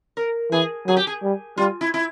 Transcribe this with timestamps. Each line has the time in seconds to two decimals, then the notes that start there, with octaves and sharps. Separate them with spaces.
0.17 A#4
0.52 E3 G#4
0.87 F#3 G#4
0.97 G4
1.07 G#4
1.23 G3
1.58 G3 F4
1.81 E4
1.94 E4